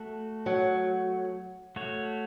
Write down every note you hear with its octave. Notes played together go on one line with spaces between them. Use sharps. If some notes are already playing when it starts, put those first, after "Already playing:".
Already playing: A3 F#4 A4
F#3
A3 F#4 C#5